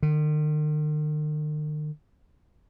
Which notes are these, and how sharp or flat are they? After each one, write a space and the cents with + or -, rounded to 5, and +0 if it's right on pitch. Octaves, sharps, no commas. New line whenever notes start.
D#3 -45